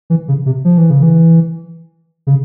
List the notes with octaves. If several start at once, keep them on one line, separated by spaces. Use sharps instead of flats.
E3
C#3
C3
F3
E3
C#3
E3
C#3